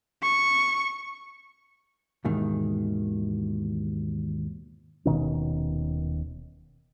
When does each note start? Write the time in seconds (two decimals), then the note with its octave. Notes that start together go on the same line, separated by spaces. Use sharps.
0.23 C#6
2.25 D#2 G#2 B2 D#3 E3
5.05 D#1 B2 D#3 C#4